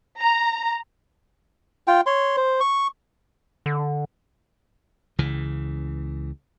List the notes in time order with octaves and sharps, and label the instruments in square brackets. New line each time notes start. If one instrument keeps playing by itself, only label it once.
[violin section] A#5
[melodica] F4 G5
C#5 C6
C5
C#6
[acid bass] D3
[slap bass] C#2 C#3 E3